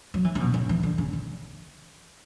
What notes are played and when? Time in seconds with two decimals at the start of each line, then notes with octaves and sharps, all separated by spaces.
0.14 F#3
0.24 E3
0.35 C#3
0.40 B2
0.54 C#3
0.69 E3
0.83 D3
0.98 C#3
1.13 D3